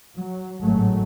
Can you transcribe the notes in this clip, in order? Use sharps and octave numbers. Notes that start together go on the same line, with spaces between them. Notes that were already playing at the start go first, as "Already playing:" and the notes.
F#3
G#1 A2 F#3 G#3 A3